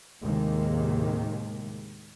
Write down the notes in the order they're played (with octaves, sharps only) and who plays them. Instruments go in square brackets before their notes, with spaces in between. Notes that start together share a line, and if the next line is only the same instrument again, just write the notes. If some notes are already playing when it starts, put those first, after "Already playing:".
[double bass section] D#2 A2 C3 D#3 G#3 A#3